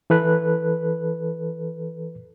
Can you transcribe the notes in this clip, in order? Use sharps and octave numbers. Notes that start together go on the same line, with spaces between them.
E3 A4 B4 F#6